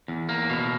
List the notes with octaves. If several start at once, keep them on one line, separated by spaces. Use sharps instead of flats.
E2
A#3
B2